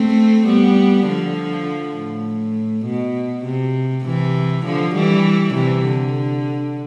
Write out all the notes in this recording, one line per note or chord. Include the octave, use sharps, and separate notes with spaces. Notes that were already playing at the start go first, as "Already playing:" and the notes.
Already playing: A3 C4
G3 B3
D3 F3
A2
B2
C3
C3 E3
D3 F3
E3 G3
C3 E3
D3